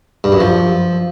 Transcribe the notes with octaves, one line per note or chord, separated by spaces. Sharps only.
G2
F#2
F3